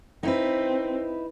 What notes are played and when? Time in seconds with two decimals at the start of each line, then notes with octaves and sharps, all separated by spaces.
0.23 C4 D#4 E4 B4